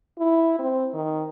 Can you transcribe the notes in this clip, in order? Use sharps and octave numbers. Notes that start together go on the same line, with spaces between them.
E4
C4
D#3